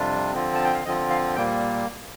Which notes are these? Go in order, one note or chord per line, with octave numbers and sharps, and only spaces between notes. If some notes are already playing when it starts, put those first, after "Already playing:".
Already playing: F2 C3 G3 D4 F4
D3 F3 C4 F4
A5
G5
F5
D3 F3 C4 F4 D#5
F5
A#2 G3 A#3 G5